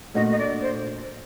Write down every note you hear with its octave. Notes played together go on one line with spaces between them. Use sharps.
A#2 A3 D4 F#4 D#5
D#5
D5
C5